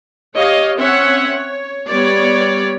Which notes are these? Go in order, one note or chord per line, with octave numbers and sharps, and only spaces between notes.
G4 C#5 D#5 F5
C4 C#4 C#5 E5 F#5
C#5
G3 B3 C#5 D5